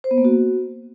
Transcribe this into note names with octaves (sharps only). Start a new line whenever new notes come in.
C5
B3
A#3
F#4